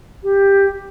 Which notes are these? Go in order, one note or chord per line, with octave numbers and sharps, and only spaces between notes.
G4